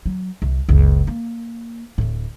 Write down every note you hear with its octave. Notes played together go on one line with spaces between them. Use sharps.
F#3
C2
F#1 C#2
A#3
D1 A2